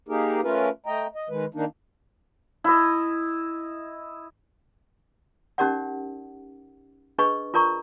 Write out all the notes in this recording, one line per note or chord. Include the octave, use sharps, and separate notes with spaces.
A#3 D#4 G4 G#4 A#4
A3 C#4 F4 A#4 B4
A3 D#5 G5 A#5
D#5
D#3 G#3 B4
D#3 A#3 D4 D#4
E4 D#5
C#4 D#4 G4 A#4 D5 F#5
D4 G#4 B4 D#5 C#6
F4 A#4 D5 A#5 C#6